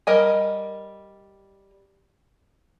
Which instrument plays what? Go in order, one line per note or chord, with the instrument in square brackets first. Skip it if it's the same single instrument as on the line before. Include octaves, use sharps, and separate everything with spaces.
[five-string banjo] G3 A#4 D#5 G#5